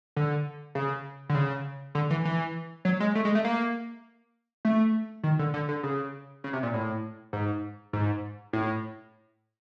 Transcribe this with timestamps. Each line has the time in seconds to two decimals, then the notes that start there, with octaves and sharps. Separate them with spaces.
0.16 D3
0.75 C#3
1.29 D3
1.35 C#3
1.95 D3
2.10 E3
2.25 E3
2.85 F#3
3.00 G#3
3.15 A3
3.25 G#3
3.35 A3
3.45 A#3
4.65 A3
5.23 D#3
5.39 D3
5.54 D3
5.69 D3
5.83 C#3
6.44 C#3
6.53 C3
6.63 A#2
6.74 A2
7.33 G#2
7.93 G#2
8.53 A2